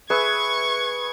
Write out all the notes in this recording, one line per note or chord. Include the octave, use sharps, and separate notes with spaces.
G#4 B4 E5 C#6 G#6